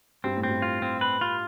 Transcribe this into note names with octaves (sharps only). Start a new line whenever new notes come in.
G2 C4
A2
C4
G2
F4
C4
B4
F4